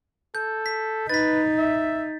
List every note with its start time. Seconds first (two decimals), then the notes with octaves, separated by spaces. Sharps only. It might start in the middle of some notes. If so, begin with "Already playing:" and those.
0.35 A4 G6
0.66 B6
1.09 D#4 B4 A6 B6
1.58 E5